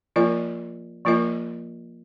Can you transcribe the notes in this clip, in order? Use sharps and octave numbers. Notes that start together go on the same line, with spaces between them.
F3 A#3 F4 A#4 D#5
F3 A#3 F4 A#4 D#5